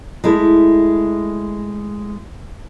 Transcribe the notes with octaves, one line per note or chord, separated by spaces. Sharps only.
G#3 A3 E4